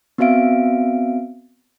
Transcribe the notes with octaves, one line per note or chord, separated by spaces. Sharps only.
B3 C4 F#4 E5 F5 D7